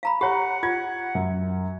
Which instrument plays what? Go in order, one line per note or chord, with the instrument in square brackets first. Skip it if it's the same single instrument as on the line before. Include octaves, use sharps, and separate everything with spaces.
[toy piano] F5 A#5 B5
[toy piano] G4 C#5 [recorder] F#5 [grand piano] A#5 B5
[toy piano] F4 [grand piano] G#6
[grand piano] F#2